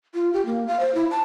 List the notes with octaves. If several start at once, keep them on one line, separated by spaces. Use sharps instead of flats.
F4
G4
A#3
F5
C5
E4
A5